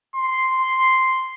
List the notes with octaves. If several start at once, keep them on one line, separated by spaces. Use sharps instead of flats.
C6